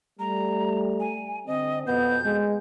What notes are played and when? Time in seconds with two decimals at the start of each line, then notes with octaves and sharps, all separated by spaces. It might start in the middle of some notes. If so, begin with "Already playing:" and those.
0.19 G3 A3 A#5
1.00 G#5
1.47 D3 C4 D#5
1.87 F2 B2 B3 G6
2.25 G#3